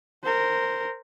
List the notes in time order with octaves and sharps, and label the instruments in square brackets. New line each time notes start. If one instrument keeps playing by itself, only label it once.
[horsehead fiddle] A#4 C5